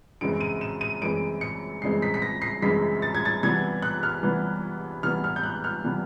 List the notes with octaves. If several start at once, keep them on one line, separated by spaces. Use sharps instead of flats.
F#2 C#3 E3 G#3 C4 D7
D#7
E7
D#7
F#2 C#3 E3 G#3 C4 D7
C#7
F#2 C#3 E3 G#3 C4 C7
B6
B6
A#6
C7
F#2 C#3 E3 G#3 C4 B6
A6
G#6
A6
C3 E3 G3 B3 G#6
F#6
F6
C3 E3 G3 B3
C3 E3 G3 B3 F6
F6
G6
F#6
F6
C3 E3 G3 B3